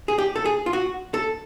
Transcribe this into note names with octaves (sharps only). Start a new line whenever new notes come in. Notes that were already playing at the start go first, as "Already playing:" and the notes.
G#4
G4
A4
G#4
F4
F#4
A4